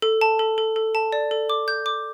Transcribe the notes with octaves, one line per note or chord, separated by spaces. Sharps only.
A4
A5
A4
A4
A4
A5
D5
A4
D6
G6
D6